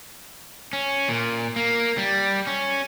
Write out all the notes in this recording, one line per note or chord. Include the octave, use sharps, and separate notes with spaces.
C#4
A#2
A#3
G3
C#4